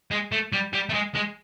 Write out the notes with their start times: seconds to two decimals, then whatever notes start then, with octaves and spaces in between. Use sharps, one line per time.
0.11 G#3
0.32 A3
0.53 G3
0.73 G3
0.89 A3
0.94 G#3
1.15 G#3